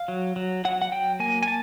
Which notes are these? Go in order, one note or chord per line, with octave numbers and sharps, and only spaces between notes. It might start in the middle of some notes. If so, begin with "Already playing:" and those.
Already playing: F5
F#3
F#3
F#3 F#5
F#5
F#3 G5
A#3 G#5
G#5
A5